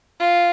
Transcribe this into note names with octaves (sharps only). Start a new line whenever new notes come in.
F4